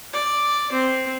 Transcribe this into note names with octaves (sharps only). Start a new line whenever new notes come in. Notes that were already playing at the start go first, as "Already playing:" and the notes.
D5
C4